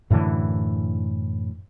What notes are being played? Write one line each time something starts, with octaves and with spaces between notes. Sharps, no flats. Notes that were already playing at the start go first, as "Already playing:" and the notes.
F#2 A2 D3 E3